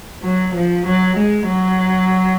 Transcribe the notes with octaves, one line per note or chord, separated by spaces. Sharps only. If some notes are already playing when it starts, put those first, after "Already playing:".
F#3
F3
F#3
G#3
F#3